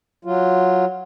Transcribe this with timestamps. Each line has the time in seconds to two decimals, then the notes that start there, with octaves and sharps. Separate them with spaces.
0.25 F#3 F4